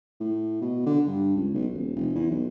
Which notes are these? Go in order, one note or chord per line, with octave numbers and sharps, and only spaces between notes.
A2
B2
D3
G2
C#2
B1
D#1
F1
E2
B1